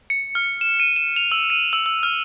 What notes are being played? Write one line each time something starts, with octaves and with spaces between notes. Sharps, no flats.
C#7
F6
E7
D#7
E7
F7
E6
D#7
E6
E6
F6